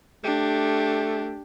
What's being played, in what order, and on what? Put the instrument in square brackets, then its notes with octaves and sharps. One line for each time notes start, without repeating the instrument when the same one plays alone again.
[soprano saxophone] A3 [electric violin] D4 G4